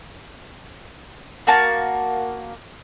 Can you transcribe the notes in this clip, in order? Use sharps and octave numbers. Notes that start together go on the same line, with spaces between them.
A#3 F#4 A5